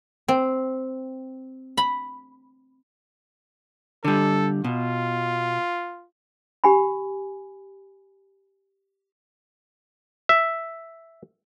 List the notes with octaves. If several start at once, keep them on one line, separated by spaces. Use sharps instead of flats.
C4
B5
D3 G3 A4
B2 F4
G4 G#5 B5
E5